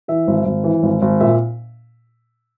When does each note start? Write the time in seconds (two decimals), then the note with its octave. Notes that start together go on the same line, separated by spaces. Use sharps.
0.08 E3 E5
0.27 G#1
0.46 G#1
0.64 E3
0.83 G#1
1.02 G#1
1.20 A#2 E5